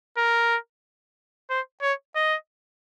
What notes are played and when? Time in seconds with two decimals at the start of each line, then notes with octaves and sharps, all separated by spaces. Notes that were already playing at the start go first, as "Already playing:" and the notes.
0.18 A#4
1.50 C5
1.82 C#5
2.16 D#5